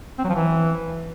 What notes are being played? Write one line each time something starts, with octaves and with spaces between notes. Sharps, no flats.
C4
F#3
F3
E3